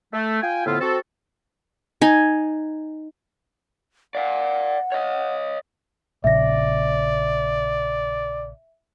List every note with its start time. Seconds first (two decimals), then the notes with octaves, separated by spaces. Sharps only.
0.13 A3
0.42 F4 G5 G#5
0.66 F2 A2 D3 B3 E4 F4
0.81 C4 F#4 A4
2.01 D#4 G#5
4.15 D5 F5 F#5
4.92 C#5 D#5
6.24 A#1 A#2 C#3 D5 E5 A#6